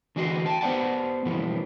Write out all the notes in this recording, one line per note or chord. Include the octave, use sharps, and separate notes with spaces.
D3 E3 F#4 D#5 F#5 C6
G5 A5
B3 C5 D5 F#5 A5
G2 B2 E3 F3